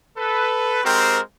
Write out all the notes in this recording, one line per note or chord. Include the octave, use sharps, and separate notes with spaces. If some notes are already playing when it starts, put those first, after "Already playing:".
A4 B4
G#3 C4 F#4 G4 A#4 C5